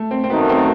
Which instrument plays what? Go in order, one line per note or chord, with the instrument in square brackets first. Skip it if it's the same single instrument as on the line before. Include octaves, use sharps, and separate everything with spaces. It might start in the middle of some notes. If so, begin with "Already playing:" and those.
Already playing: [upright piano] A3
C4
C4
[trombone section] F#2 D#3 A3 D#4 F#4 [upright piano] B3
[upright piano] C4